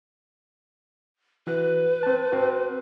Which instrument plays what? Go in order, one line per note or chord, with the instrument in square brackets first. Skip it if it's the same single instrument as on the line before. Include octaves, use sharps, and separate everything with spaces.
[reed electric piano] E3 F#4 F#6 [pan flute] B4
[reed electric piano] C4 A5
C4 F#4